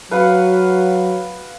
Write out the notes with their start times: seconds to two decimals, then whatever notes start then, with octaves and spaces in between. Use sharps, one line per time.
0.11 F#3 B4 F5 F#5